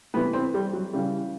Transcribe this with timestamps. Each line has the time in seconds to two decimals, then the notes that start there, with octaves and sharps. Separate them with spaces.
0.14 C3 E3 B3
0.33 C4
0.54 G3
0.73 F#3
0.93 C#3 E3 G3